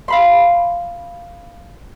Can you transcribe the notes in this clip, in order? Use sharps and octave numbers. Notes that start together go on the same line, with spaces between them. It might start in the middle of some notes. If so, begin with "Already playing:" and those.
F5 B5 C6